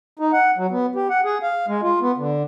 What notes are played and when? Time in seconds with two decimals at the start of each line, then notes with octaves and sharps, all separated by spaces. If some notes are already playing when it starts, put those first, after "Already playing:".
0.19 D#4
0.33 F#5
0.58 F#3
0.71 B3
0.95 G4
1.10 F#5
1.25 G#4
1.43 F5
1.68 G#3
1.83 F4
2.01 B3
2.17 D3